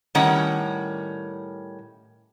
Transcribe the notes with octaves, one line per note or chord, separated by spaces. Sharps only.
A2 D#3 G3 C#4 F#5